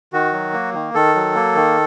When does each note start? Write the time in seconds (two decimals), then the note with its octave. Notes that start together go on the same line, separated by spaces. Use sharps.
0.13 D#3 F#4
0.33 F#3
0.53 A#3
0.74 D#3
0.94 D#3 A4
1.15 F#3
1.35 A#3
1.55 D#3